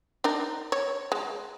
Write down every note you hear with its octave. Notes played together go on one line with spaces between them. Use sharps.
D4 D#4 A#4
C#5
G#3